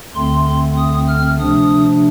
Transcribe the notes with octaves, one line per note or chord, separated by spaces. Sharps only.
D2 D3 A3 C4 C6
D#6
F6
C3 F3 A3 D4 D#6